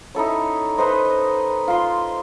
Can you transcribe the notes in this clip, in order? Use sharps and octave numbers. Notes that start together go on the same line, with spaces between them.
D#4 E4 A4 C#5
D#4 B4 C5 D#5
F4 C6